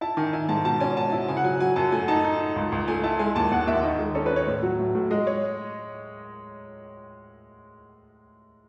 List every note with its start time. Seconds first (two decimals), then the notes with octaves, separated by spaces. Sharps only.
0.01 E4 A5
0.17 D#3 G#5
0.33 E4 G#5
0.49 G#2 A5
0.65 B2 A5
0.80 C#4 G#5
0.97 B2 A5
1.12 E4
1.28 C#3 G#5
1.37 F#5
1.44 F#3 G#5
1.60 F#3 G#5
1.76 F#2 A5
1.92 A3 G#5
2.08 D#4 A5
2.24 D#4
2.40 D#4
2.56 C#2
2.72 C#2
2.88 A3 G#5
3.04 E4 A5
3.19 G#3 G#5
3.36 D#2 A5
3.51 D#2 F#5
3.67 D#2 E5
3.83 D#3 D#5
3.99 G#3
4.15 C#4 A4
4.26 B4
4.31 C#4
4.36 C#5
4.47 A2
4.63 F#3
4.79 A2
4.95 A2
5.11 G#3 D#5
5.27 C#5